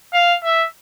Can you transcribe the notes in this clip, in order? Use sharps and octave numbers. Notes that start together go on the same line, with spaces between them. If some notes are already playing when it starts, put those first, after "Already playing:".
F5
E5